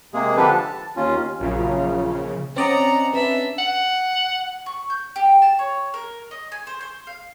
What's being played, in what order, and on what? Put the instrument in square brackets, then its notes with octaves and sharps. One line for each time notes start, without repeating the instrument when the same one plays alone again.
[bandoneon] C3 G#3 A#3 G#4
D3 F3 D4 G4 A4 B4
A5
D#2 C#4 F4
[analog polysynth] A#1 C#3 [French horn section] F#2 F4
[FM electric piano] C4 D5 D#5 [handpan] C#4 [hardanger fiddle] F#5 A#5
[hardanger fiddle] D4 E5 [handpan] B4
[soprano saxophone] F#5
[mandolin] C#6
G6
G4
A5
C#5
A#4
D#5
G#5
C5
C5
F5